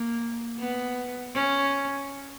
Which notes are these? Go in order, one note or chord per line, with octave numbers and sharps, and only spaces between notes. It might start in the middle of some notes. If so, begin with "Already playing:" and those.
Already playing: A#3
B3
C#4